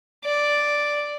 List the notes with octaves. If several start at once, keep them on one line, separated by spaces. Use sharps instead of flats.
D5